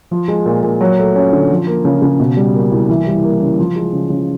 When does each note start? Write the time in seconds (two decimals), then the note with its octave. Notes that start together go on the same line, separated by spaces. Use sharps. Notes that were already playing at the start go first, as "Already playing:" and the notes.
0.11 F3
0.28 G#3
0.46 A#2
0.63 A#2
0.81 F#3
0.98 A3
1.16 C#4
1.33 D3
1.51 F3
1.67 A#3
1.85 C#3
2.02 C#3
2.20 B2
2.37 G3
2.54 A#3
2.72 C2
2.89 E3
3.06 G3
3.24 A#3
3.41 C#3
3.59 F3
3.76 G#3
3.93 C#3
4.10 C#3